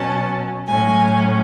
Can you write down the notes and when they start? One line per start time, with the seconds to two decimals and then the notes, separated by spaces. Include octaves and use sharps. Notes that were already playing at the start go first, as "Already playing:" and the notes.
Already playing: B2 F#3 C#4 A5
0.67 A2 F#3 C#4 G#5